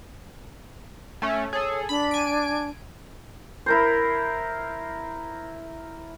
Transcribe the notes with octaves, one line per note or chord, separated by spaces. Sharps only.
A3 C#4
G#4 A4 C#5
D4 B5
G#5 D7
E4 A#4 C5